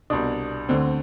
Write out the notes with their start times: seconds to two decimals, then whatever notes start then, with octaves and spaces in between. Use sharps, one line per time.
0.10 C2 B2 D4
0.69 D2 D3 C4